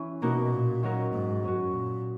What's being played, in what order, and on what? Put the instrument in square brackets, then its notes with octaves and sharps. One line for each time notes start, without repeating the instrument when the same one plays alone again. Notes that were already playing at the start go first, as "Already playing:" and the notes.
Already playing: [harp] E3 C#4 E4
[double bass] B2 [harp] A#3 D#4 F#4 A#4
[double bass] A#2
[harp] D#3 F#3 C#4 F#4 A#4
[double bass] G#2
[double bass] F#2 [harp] F#3 C#4 F#4
[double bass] A#2